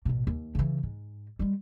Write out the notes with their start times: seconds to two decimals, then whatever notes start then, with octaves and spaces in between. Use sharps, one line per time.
0.05 A1 B2
0.27 D#2
0.55 C#3 E3
0.83 G#2
1.39 G3 G#3